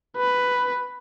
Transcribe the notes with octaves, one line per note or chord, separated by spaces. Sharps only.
B4